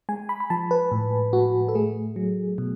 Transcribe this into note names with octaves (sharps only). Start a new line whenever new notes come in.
G#3 G#5
B5
B5
F3 A5
B4
A2
A2 F#4
A4
A3 G#4
F#3
B2